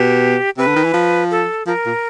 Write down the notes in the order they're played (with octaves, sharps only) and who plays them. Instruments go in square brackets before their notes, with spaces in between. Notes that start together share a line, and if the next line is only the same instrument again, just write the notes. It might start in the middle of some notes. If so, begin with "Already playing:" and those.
Already playing: [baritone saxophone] B2 [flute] G4
[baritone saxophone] C3 [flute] B4
[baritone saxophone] D3
D#3
E3
F3
[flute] A4
[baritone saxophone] F3 [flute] A#4
[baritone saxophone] A#2